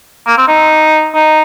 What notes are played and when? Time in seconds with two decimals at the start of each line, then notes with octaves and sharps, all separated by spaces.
0.27 A#3
0.38 C4
0.48 D#4
1.15 D#4